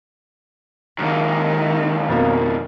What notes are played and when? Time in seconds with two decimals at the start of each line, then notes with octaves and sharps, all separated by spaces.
0.98 F#2 A#2 D#3
2.09 F2 B2 A#3